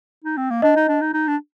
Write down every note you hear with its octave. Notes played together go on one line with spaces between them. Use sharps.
D#4
C4
A#3
D4 D#5
D#4
D4
D#4
D#4
D4